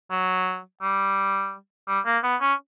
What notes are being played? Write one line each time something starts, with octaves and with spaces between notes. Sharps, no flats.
F#3
G3
G3
A#3
B3
C#4